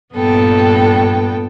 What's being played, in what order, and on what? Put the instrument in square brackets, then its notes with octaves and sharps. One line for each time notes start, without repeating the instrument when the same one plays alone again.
[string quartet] G2 A#2 B3 A4 G5